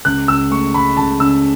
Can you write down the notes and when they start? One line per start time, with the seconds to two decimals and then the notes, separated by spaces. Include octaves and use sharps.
0.05 C#2 F#6
0.28 C#2 E6
0.51 A3 C#6
0.74 C#2 B5
0.97 C#2 A5
1.19 C#3 E6